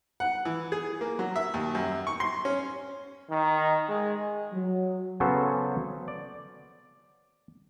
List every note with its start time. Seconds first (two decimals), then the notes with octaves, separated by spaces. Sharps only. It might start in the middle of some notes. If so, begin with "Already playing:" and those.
0.20 F#5
0.45 E3
0.72 G#4
1.01 A#3
1.19 F#3
1.36 E5
1.54 D#2
1.75 F#2
2.07 C#6
2.20 C6
2.45 C#4
3.31 D#3
3.88 G#3
4.52 F#3
5.20 C#3 F#3 B3 C#4 A4 C5
6.08 D5